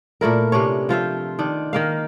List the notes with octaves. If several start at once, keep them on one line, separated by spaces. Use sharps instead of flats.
A#2 A3 E4 A#4
C3 C#4 D4 C#5
F3 F4 C5 E5
D#3 D4
D#3 A#3 F5